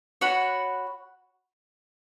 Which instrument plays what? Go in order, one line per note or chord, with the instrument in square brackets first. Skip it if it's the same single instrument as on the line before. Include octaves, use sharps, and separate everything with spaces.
[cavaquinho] F#4 C#5 F#5 B5